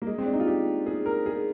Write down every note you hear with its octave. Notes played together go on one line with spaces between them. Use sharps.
A#3
G#3
C4
D4
D#4
F4
G4
G#4
A#4
G#4